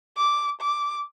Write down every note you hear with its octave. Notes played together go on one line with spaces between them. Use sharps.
D6
D6